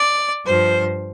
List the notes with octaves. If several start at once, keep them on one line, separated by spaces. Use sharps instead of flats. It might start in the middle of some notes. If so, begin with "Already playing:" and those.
Already playing: D5
G2 F3 C5